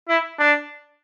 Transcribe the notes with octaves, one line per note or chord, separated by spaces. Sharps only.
E4
D4